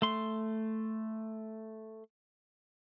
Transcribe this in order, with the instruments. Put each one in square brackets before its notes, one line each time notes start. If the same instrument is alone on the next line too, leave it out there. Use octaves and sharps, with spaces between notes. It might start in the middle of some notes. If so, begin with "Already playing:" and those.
[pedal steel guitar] A3 C6